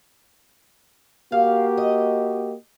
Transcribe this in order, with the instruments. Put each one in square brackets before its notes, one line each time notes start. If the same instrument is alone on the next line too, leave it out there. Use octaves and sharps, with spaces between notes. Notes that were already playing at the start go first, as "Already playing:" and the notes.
[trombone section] A#3 F#4 G4 [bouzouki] F5
[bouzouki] D#5